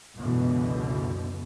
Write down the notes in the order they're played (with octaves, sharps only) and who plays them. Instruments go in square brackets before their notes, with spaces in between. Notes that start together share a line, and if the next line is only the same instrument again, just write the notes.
[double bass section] C#2 F#2 B2 D3 E3